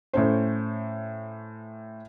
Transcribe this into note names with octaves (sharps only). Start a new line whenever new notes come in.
A2 C#4 C5